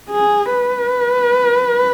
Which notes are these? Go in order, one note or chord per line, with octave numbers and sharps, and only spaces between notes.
G#4
B4